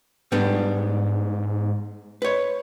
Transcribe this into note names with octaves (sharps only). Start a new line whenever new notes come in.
G#2 G3 B3 D4
B4 C#5